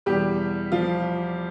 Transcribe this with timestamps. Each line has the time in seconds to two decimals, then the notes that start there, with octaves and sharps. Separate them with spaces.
0.06 E2 B2 G3 G4
0.72 F3 F4